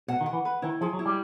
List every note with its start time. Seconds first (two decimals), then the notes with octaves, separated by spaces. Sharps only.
0.08 B2 F#5
0.21 D#3
0.26 F#5
0.33 E3
0.45 B4
0.62 D#3 E4
0.81 F3 G#4
0.93 F#3
0.99 E4
1.06 G3